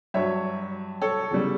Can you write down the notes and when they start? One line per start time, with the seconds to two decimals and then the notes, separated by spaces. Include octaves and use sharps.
0.14 G2 F#3 C#5 E5
1.01 A4 C#5
1.31 E2 C#3 G3